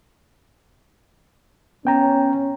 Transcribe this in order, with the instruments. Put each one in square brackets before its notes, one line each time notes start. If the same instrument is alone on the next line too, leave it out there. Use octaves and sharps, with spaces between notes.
[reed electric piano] B3 G5 A#5 [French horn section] C#4